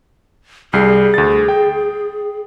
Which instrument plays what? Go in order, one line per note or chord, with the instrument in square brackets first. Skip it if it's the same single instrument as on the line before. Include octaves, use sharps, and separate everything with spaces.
[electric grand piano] C2 G3 C7 [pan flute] G#4
[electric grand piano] D2 A6
G5